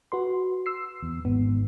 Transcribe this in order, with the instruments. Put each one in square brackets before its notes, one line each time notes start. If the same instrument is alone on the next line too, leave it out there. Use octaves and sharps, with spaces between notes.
[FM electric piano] F#4 B4 C6
E6 C7
[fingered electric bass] E2
[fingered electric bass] G#1 G#2 [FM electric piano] B3